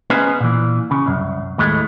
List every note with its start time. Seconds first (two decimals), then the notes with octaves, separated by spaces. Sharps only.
0.10 B3 C#4 D#4 G#4 B4 C5
0.40 A#2 E3
0.91 C#3
1.06 C2 F#2
1.58 D#2 A2 G#3 A3